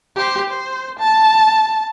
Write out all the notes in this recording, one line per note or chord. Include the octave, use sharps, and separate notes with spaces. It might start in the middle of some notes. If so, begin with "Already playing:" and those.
G4 C5
C5
A5